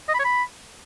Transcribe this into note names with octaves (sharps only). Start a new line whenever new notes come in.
D#5
B5
C#5
B5